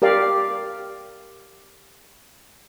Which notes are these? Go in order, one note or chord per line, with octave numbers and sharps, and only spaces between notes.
G4 A#4 D5 F5